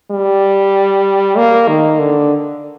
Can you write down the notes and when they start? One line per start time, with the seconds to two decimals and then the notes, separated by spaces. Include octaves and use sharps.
0.11 G3
1.37 A#3
1.68 D#3
1.99 D3